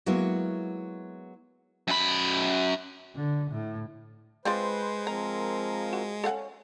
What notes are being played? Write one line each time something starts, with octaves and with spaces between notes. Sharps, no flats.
F#3 G#3 A#3 B3 E4 F#4
F#2 B5
D3
A2
G#3 C4 F4 B4 C5 D5
F3 C4 A#4 A#5
F#4
C#4 A4 F5 F#5